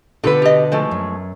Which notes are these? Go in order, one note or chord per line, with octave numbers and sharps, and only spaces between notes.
B2 D3 F4 G4 A4 B4
G4 D#5
F3 G#3 A3
F#2